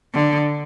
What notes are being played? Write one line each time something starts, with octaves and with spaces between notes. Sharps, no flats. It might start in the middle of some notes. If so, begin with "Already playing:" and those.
D3